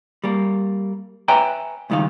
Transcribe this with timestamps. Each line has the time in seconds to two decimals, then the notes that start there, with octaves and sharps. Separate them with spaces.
0.24 G3 A#3
1.28 B4 C#5 E5 G5 G#5 A#5
1.90 C#2 G2 D#3 D#4 F5